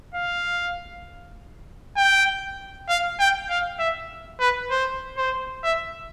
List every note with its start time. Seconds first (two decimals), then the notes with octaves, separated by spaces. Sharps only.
0.15 F5
1.97 G5
2.89 F5
3.20 G5
3.50 F5
3.79 E5
4.40 B4
4.71 C5
5.17 C5
5.63 E5